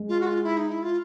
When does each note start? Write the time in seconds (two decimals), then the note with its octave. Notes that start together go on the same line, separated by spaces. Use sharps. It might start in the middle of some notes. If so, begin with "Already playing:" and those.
Already playing: G#3
0.09 F4
0.21 F#4
0.26 F4
0.43 E4
0.57 D#4
0.70 E4
0.83 F4